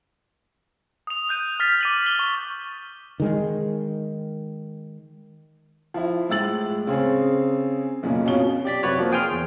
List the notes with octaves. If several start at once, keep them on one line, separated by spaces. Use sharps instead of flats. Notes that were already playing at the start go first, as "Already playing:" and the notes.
D#6 F7
D#6 F#6 G6 D#7
F6 A6 B6
D6 D#7 F#7
B6 G7
C#6
D#3 G#3
F3 E4
A2 G#3 E6 A6 F#7
C#3 C4 G#4
B1 F#2 A#2 C#3
F2 B2 C#4 F4 G7
G4 D5 B6
F#2 C3 F#4 B4 C#5 D5
F3 A#3
G#4 G5 G#5 C6 F6
E2